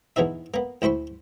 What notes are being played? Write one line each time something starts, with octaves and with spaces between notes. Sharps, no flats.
E2 E3 B3 D#4 E5
A#3 B3
D2 E4 C5 B5 C#6